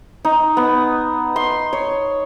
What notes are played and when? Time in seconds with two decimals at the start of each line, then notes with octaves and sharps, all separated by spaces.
0.25 D#4
0.57 B3
1.36 C6
1.73 C#5